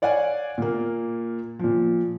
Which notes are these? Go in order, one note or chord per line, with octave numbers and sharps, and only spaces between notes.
C#5 D5 F5 F#5 G#5
A#2 A#3
A#2 F3